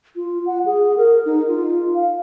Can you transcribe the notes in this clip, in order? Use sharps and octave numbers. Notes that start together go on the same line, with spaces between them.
F4
F#5
G#4
A#4
D#4
F4
F5